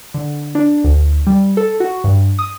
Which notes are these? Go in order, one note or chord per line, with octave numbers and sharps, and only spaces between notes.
D3
D4
D2
G3
A4
F#4
G2
D#6